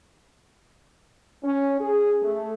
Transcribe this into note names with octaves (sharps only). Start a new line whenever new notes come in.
C#4
G#4
A3